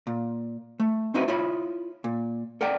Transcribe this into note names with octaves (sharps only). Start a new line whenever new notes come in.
A#2
A3
C4 C#4 D#4 E4 F#4 B4
E4 F4 C#5 B5
A#2
A4 A#4 D5 F#5 G5